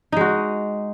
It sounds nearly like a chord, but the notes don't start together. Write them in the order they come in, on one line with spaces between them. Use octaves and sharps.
D#4 G#3 F#4